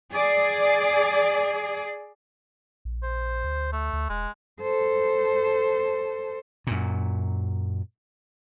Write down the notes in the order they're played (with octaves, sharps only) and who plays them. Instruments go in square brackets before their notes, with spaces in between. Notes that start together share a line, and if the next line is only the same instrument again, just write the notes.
[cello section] G#4 D5
[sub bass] A#1
[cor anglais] C5
[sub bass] D2
[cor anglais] A3
[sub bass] D2
[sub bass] E1 [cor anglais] G#3
[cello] A4 C5
[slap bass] F#2 A#2